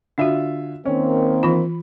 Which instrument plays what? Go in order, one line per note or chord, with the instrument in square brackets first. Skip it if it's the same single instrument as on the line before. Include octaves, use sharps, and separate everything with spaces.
[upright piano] D3 F4 E5 [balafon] D4 F#4
[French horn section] D#3 A#3 C4 [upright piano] C#4
[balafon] E3 F4 [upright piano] B5